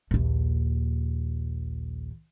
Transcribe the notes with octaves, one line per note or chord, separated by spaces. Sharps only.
A#1 D#2